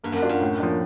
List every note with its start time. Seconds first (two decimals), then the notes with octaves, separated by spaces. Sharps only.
0.04 G2 A#3
0.12 F#2
0.22 D4 F4
0.29 F#2
0.41 A2
0.60 F3 A#3 D4